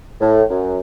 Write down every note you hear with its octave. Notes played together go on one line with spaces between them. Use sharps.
A2
F#2